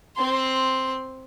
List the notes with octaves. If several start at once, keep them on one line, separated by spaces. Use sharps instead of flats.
C4 C6